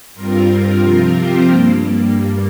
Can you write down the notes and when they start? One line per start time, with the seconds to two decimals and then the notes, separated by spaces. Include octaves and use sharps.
0.14 G2 G3 C4 F4 A#4
0.80 C3 F3 C4
1.12 G4 C5
1.46 G2 G3 A#3